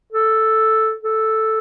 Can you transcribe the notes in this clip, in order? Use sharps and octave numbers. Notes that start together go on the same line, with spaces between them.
A4
A4